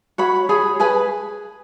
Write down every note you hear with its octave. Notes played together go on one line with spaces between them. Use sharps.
F#4 C#5 B5
G#4 C#5 B5
G#4 B4 G#5 B5